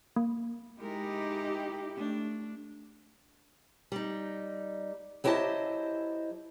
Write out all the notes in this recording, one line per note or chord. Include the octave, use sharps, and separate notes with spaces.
A#3
G#3 D#4 E4 G4 A#4
A3 D4
G3 D#4
F#3 E4 G4 C5 D#5 A5